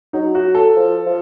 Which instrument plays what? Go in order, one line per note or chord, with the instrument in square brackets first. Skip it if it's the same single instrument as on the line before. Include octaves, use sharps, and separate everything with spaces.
[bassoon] F#3 [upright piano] D#4
[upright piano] F#4
A4
[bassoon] F3
F3